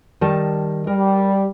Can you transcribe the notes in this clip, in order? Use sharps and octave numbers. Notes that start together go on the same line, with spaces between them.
D#3 G3 A5
G3 A#4